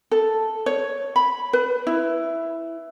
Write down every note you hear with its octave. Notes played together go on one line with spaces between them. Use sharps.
A4
C#5
B5
B4
E4